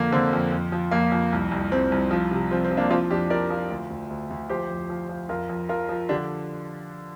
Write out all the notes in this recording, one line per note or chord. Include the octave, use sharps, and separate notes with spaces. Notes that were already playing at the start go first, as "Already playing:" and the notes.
Already playing: F2 D3 A#3
D3 C4
F2
F2
F3
F2 A#3
F2
C2
C2
C2 C4
C2
F3
C3
F3 C4
C4
F3
A#3 D4
F3 C4 F4
F2 D4 G4
F3 A#4 D5
F3
D2
D2
D2
D2
F3 G4 C5
F2
F3
F3
F2 F4 A#4
F2
F3 F4 A#4
F3
D3 D4 G4